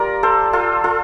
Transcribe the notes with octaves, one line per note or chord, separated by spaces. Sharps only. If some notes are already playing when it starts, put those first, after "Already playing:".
Already playing: G3 F4 A#4 D5
A4 C5
F4 A4
F4 A4